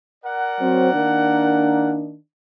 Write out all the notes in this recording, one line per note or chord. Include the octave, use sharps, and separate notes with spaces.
A#4 D5 F#5
F#3 C4
D#3 A#3 D4